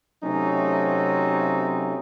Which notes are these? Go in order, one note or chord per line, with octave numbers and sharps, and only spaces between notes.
C3 F#3 A3 C4 C#4 D#4